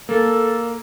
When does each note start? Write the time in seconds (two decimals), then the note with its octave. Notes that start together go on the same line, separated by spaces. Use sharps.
0.09 A#3 A4